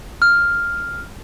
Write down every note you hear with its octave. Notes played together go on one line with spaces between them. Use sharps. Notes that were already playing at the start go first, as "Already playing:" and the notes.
F6